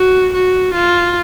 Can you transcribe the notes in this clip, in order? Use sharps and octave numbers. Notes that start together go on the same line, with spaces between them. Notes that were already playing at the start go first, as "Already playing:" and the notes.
Already playing: F#4
F#4
F4